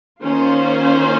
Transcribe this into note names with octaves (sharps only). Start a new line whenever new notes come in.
D#3 A#3 C#4 F4 C5